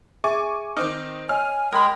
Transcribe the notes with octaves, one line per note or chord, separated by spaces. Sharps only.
G#4 E5 G#5 C#6 D6
D#3 C4 D#4 D6 D#6 F6
C#5 D#5 G#5 F6
G#3 G#4 A#4 G5 B5